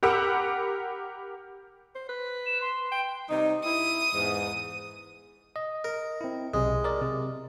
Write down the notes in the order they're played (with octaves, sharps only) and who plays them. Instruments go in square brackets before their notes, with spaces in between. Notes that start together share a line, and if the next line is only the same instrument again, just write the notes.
[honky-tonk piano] G4 A#4 F#5 B5 D6 E6
[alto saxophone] C5
B4
[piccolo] E7
C6
[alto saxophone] G5
[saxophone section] C3 G3 D#4
[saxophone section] E4 [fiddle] D#6
[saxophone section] E2 G#2
[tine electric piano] D#5
[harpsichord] A#4
[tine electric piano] C4 E4
[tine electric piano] B1 C3 [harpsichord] G#3
[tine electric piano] A#4 D5
C3